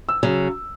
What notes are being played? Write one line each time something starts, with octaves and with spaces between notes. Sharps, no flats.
E6
C#3 F#3